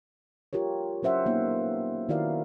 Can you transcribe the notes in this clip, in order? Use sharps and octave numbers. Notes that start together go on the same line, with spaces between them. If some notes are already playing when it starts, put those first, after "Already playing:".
F4 G4 A#4 C#5
F#3 C#4 C5 E5 F#5
A#3 B3 D#4
D#3 E4 F#4 A#4 D5 F5